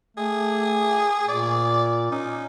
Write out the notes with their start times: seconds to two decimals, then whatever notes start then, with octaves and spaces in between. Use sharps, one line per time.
0.17 A3 G#4
1.28 A#2 D5
2.11 C#4 D#4